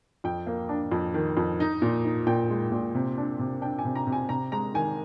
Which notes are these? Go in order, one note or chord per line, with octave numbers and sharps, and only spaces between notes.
F2 G5
A#3
D4
F2
D#3
F2
D#4
A#2
D#4
A#2 G5
G#3
A#2
C3
D4
C3
D4 G5
G#5
C3
A#5
C3
G#5
C3 A#5
G#3 A#5
D#3 G#5